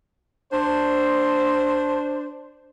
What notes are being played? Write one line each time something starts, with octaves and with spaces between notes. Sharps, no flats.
D4 C5